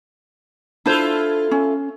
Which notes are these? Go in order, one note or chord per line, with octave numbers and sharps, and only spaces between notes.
D4 E4 F4 A4 C5
C#4